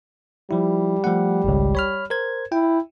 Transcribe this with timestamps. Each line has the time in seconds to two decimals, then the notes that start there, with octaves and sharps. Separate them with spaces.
0.51 F3 G3 E4
1.04 F3 A3 F#5
1.44 G#1 C#2
1.75 C#5 B5 F6
2.10 A#4 C5 G#6
2.52 E4 G5